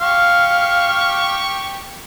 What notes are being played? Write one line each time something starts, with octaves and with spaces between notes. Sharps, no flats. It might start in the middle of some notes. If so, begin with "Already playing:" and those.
G4 F5 C#6